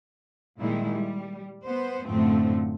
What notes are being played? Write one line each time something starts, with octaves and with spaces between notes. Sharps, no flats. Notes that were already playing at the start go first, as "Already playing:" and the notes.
A#2 D#3 G3 G#3 E4
G3
B3 C5
F#2 A2 D3 F3 A3 C4